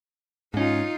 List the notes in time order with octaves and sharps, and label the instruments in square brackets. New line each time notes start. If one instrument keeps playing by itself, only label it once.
[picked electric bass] G#2 C#4 [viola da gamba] D#4 F4